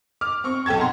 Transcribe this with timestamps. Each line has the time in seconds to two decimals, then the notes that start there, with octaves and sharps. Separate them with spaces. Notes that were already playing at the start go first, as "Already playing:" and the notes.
0.21 D6 F6
0.44 C4 C#6
0.66 B1 A4 G5 A5 G#6
0.77 F#5 A#5 C6